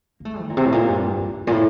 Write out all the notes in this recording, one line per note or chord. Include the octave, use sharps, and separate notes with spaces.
A#3
A3
D#3
A#2
C3
A2
A#2
G2
G2
A#2
A2